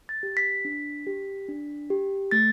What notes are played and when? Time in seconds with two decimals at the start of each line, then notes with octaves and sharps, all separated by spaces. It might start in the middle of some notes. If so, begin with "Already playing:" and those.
0.09 A6
0.23 G4
0.37 B6
0.65 D4
1.07 G4
1.49 D4
1.90 G4
2.31 A3 A6